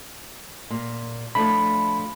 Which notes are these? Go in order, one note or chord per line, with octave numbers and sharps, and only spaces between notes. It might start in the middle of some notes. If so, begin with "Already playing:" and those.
A#2
F3 A3 D4 B5